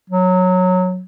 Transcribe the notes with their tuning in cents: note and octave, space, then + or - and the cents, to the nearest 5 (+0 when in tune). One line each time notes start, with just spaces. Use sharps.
F#3 -15